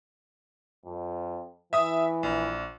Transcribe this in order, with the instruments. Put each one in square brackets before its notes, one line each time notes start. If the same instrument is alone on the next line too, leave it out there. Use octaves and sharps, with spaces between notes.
[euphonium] F2
[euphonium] E3 [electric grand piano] E5 D#6
[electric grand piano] A#1